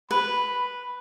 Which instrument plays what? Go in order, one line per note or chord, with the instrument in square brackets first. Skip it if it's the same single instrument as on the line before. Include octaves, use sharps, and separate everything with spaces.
[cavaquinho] B4 [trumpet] B5